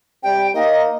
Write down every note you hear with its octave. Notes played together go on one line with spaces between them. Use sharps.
C3 G3 G5
A#3 D#4 D#5